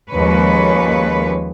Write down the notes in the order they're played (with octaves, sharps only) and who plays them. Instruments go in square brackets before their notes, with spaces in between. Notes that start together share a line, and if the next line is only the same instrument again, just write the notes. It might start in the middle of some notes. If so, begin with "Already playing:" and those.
[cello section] D#2 F3 G#3 C#4 B4 C#5